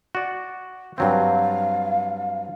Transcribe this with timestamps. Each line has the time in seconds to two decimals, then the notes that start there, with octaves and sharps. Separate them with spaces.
0.15 F#4 D5
0.98 G2 F#3 C4 F5